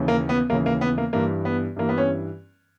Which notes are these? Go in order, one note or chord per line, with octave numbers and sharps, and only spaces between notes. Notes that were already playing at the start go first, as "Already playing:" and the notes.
Already playing: D#2 C#3 E3
A#3
B3
D#2 C#3 E3 A#3
A#3
B3
A#3
G2 E3 A#3
B3
G2 E3 A#3
B3
C#4